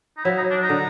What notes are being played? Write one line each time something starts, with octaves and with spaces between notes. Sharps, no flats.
D#4
F#3 E4
D#4
D4
D#4
D3